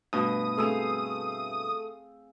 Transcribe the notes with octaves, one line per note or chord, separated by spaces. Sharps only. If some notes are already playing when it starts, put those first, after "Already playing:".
G2 B2 A3 D#6
A3 C4 G#4 F5 E6 D#7